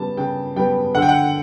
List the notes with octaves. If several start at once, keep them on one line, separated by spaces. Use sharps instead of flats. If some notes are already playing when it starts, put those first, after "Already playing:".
Already playing: C#3 G3 B3 A5
C#3 G5
G3 B3 G5
D3 F#5
G5
F#5